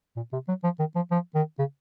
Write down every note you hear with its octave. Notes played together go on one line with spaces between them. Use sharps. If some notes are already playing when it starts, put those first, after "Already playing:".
A#2
C3
F#3
F3
D#3
F3
F3
D#3
C#3